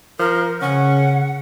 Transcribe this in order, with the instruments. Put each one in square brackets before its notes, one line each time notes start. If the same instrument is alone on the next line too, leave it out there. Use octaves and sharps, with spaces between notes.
[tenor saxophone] F3 [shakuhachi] A#4
[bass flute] C#3 [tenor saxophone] C#4 [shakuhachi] F#5